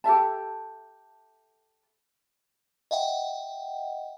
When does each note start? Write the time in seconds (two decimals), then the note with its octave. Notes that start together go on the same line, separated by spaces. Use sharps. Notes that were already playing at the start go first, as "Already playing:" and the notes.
0.04 G4 A4 E5 A5
2.91 D#5 E5 F#5 G5